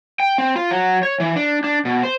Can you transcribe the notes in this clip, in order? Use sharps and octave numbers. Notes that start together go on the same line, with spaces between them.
G5
C4
F4
F#3
C#5
E3
D4
D4
B2
C5